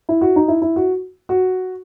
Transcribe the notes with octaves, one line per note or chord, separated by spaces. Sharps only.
E4
F#4
D#4
E4
E4
F#4
F#4